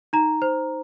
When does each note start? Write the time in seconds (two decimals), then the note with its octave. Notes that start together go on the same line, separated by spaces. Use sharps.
0.13 D#4 A#5
0.42 C5